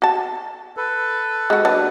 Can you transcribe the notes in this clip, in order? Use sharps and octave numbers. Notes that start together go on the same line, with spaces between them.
F#4 A5
A4 B4
G#3 F#4
F#3 A#3 D4 B4 A5